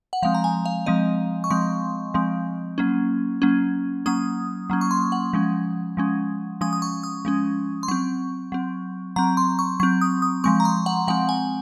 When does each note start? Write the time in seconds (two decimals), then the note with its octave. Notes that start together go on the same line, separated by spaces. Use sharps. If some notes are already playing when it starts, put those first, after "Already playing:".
0.13 F#5
0.22 F3 G#3 C4 F5
0.34 A#5
0.44 G#5
0.65 F5
0.86 F3 G#3 C4 D#5
1.44 C#6
1.50 F3 G#3 C4 C6
2.14 F3 G#3 C4
2.78 F#3 A#3 C#4
3.42 F#3 A#3 C#4
4.06 F#3 A#3 C#4 D#6
4.70 F#3 A#3 C#4
4.81 C#6
4.91 C6
5.12 F#5
5.33 F3 G#3 C#4
5.97 F3 G#3 C#4
6.61 F3 G#3 C#4 D#6
6.73 D#6
6.82 C#6
7.04 D#6
7.25 F3 G#3 C#4
7.83 C6
7.88 F#3 C4 C#6
8.52 F#3 C4
9.16 F#3 C4 A#5
9.37 C6
9.59 C#6
9.80 F#3 C4 C#6
10.01 D#6
10.22 D#6
10.44 F3 G#3 C4 C#6
10.60 A#5
10.65 C6
10.86 F#5
11.08 F3 G#3 C4 F#5
11.29 G#5